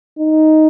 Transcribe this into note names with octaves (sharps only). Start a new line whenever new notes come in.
D#4